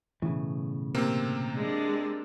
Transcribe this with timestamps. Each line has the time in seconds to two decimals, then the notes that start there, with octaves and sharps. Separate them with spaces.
0.22 B1 A2 C#3 E3
0.95 C3 A#3 C4
1.54 G#3 D4